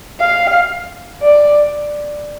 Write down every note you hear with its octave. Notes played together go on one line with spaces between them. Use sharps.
F5
D5